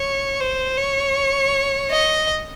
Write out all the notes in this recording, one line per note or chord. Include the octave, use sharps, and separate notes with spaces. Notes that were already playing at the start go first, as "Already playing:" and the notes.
Already playing: C#5
C5
C#5
D#5